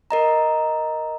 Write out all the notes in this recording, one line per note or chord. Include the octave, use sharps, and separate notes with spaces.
A#4 D#5 A#5